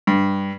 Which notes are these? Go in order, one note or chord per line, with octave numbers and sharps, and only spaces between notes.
G2